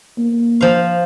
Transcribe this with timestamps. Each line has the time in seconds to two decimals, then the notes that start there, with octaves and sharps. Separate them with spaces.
0.18 A#3
0.61 F3 F5